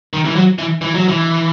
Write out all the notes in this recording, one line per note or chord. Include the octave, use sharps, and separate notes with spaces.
D#3
E3
F#3
E3
E3
F#3
E3